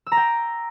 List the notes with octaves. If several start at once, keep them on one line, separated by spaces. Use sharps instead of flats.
E6
A#5
G5